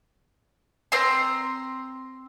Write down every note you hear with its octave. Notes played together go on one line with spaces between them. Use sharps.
C4 A#5 C6